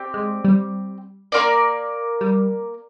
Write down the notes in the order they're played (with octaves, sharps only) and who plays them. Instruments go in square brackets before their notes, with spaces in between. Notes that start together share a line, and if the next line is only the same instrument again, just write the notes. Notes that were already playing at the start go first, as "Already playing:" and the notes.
Already playing: [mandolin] C4 G4 D5
[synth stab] G#3
G3
[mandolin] A#3 F4 A#4 D5
[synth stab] G3